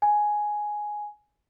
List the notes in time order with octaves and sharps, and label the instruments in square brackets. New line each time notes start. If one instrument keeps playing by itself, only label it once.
[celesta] G#5